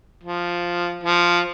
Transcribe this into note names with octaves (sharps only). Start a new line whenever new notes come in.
F3
F3